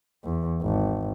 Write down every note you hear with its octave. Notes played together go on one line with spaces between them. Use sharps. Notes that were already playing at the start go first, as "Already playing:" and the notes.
E2
G#1